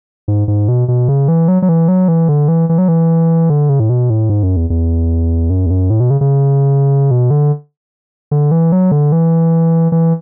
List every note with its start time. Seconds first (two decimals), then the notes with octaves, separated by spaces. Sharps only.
0.28 G#2
0.48 G#2
0.68 B2
0.88 B2
1.08 C#3
1.28 E3
1.48 F#3
1.62 F#3
1.69 E3
1.88 F#3
2.08 E3
2.28 D3
2.48 E3
2.69 E3
2.78 F#3
2.88 E3
3.49 D3
3.69 C#3
3.80 A2
3.90 B2
4.10 A2
4.29 G#2
4.43 F#2
4.57 E2
4.70 E2
5.50 F#2
5.66 E2
5.70 F#2
5.90 A2
6.00 B2
6.10 C#3
6.21 C#3
7.11 B2
7.31 D3
8.31 D3
8.51 E3
8.72 F#3
8.92 D3
9.12 E3
9.92 E3